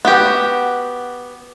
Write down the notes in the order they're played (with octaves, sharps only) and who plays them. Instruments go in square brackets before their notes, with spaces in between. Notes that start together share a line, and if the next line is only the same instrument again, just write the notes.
[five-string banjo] B3 F#4 G4